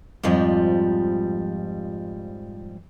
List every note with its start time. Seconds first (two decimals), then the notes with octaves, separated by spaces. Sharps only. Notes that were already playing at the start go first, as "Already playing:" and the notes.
0.23 F2 G#2 F3 G3